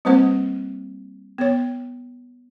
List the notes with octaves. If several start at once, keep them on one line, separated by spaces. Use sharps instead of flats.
G3 A#3 C4 B4 C5 F#5
B3 C#5